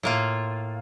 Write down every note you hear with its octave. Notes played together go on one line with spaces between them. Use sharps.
A2 A#3 F4